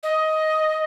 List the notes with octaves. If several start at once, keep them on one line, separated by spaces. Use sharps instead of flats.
D#5